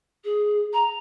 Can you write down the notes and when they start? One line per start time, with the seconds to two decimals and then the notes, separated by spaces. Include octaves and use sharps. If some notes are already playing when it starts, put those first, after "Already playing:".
0.24 G#4
0.73 A#5